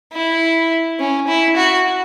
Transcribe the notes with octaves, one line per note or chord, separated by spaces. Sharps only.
E4
C#4
E4
F#4